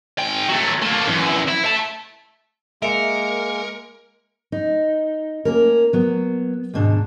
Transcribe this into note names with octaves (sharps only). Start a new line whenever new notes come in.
G#2 G5
F#3 A3
A3 A#3
F#2 E3
E4
E5 A5
G#3 A#3 A#4 E5 C#7 D7
D#4
A#3 C#4 A#4
F#3 B3
D#2 G#2 B2 D4